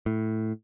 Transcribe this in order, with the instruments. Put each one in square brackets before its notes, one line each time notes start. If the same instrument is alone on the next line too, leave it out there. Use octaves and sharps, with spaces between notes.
[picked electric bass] A2